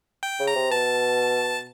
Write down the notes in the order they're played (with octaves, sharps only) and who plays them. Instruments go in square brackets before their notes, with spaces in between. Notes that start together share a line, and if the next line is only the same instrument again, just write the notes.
[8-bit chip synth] G5
[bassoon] C#3
[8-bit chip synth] A#5
[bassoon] C3
[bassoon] B2 [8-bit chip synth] A5